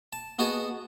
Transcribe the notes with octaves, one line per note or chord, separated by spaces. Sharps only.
A5
B3 F#4 G#4 D#5 A5